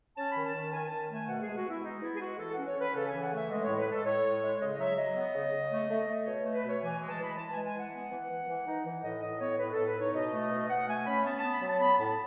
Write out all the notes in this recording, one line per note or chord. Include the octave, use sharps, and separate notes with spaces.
C#4 A5
D#3 B5
A5
D#3
D#3 G#5
D#3 A5
A3 G#5
B2 F#5
G#3 G#4
F#4
B3 E4
G#3 D#4
B3 E4
G#4
G#3 F#4
E3 A4
C#4 F#5
C#5
C#4 B4
C#3 A4
G#5
E3
F#5
A3 E5
G#3 D#5
A2 C#5
B4
G#3 A4
A2 C#5
A2
G#3
C#3 D#5
F#3 E5
F#3 D#5
B3
C#3
C#3
A3
A3
A3
B2 C#5
A3
B4
B2 C#5
E3 G#5
G#3
A5
E3 B5
E3 A5
G#3 G#5
G#5
E3 F#5
B3
E3
E3
E3
D#4
E3
A2 D#5
A2 D#5
B3 C#5
A2 B4
A2 A4
B4
D#4 C#5
B2 D#5
A3
B2
B2 F#5
A3 G#5
C#4 B5
B3 A5
B3 A5
B5
F#3
A5
B3 B5
A2 A5